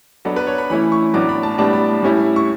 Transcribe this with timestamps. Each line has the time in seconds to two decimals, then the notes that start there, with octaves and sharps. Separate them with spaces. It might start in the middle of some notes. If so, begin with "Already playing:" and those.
0.25 F#3 B3 D4 A4
0.36 B4
0.47 C#5
0.58 B5
0.70 E3 A3 C#4 E4 B5
0.92 C#6
1.14 A2 F#3 B3 D4 D6
1.29 B5
1.43 A5
1.58 A2 G3 B3 D4 A5
1.73 B5
2.03 A2 G3 C#4 E4
2.36 C#6